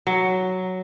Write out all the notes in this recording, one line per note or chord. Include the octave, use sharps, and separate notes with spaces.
F#3